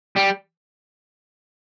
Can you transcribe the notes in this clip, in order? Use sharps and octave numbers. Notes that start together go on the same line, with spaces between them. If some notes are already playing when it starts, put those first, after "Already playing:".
G3